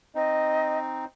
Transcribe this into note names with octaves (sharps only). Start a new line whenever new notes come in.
C4 D#4 D#5